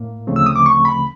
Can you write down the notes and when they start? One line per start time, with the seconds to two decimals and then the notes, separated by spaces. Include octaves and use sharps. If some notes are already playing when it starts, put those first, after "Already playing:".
Already playing: A2 A#3
0.27 D2 C#3 F3 A3 C4
0.36 E6
0.46 D#6
0.56 D6
0.66 C#6
0.85 B5